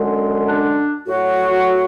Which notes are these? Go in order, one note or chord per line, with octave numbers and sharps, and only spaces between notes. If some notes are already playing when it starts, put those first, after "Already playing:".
Already playing: F#2 D3 G#3
D4
A2 F#3 F#4